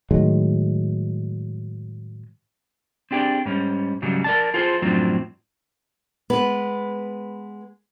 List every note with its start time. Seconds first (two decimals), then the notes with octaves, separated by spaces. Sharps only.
0.11 A2 D#3 F#3 G#3
3.11 C4 D4 G4 G#4 D5
3.46 G#2 G3 C#4
4.02 G#2 C#3 F#3 G3
4.24 A#4 D5 A5
4.54 F4 G#4 A4 C5
4.82 F#2 A2 F3 F#3 C4 D4
6.30 G#3 B3 B4